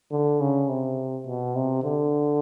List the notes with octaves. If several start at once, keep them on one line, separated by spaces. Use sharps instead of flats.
D3
C#3
C3
B2
C3
D3